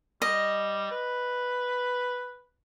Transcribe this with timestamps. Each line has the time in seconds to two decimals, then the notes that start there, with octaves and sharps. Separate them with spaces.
0.22 G3 D#5
0.91 B4